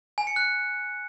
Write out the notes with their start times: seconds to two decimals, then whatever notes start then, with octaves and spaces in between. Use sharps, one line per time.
0.18 G#5
0.27 C#7
0.36 F#6